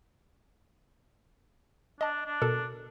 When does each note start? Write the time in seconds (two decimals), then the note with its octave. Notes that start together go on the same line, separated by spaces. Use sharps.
2.01 D4 D#5 A5
2.26 D4
2.42 B2 A4 A#4